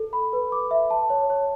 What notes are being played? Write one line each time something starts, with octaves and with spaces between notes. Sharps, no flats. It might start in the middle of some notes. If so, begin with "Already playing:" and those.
Already playing: A4
B5
B4
D6
E5
A5
C#5
C#5